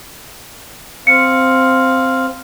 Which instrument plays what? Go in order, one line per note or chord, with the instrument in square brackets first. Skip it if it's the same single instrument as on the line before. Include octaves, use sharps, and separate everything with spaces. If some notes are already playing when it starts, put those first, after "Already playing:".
[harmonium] C4 F5 [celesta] C#7